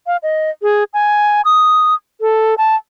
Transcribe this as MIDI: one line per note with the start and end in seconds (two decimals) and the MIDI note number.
0.07 0.17 77
0.23 0.50 75
0.63 0.84 68
0.94 1.42 80
1.45 1.94 87
2.21 2.55 69
2.58 2.76 81